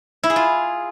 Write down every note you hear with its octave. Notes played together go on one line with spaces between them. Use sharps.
E4
G#4
F4